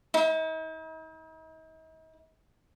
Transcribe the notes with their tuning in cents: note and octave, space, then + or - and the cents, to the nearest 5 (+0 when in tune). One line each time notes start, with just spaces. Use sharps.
D#4 +45